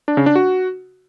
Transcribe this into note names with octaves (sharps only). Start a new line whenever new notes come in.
D4
C#3
D4
F#4